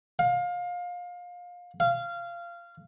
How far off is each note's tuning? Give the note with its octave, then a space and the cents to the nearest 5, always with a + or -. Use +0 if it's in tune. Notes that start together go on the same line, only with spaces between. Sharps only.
F5 +25
F5 -20